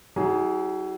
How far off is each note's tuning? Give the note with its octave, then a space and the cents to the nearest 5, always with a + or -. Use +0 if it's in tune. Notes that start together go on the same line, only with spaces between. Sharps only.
F#3 +35 E4 -40 G#4 +0